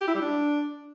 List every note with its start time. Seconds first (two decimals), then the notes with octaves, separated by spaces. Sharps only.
0.01 G4
0.08 E4
0.15 G3
0.21 D4